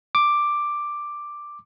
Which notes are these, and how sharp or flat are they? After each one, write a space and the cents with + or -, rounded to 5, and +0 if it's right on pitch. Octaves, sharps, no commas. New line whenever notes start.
D6 +5